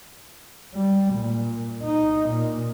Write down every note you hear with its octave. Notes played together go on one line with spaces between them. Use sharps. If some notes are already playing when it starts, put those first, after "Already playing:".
G3
A#2
D#4
A#2